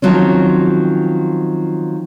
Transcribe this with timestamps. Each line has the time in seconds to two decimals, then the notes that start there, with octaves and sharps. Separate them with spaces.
0.02 D#3 F3 F#3 C4 C#4